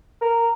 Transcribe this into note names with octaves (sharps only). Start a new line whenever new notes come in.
A#4